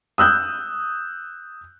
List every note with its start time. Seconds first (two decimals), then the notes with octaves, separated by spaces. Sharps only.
0.18 D#6 E6 F#6 G6